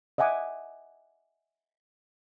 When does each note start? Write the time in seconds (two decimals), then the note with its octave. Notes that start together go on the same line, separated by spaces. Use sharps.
0.18 D#5 E5 F#5 G#5 D6